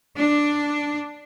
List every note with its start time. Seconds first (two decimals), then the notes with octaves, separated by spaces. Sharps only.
0.18 D4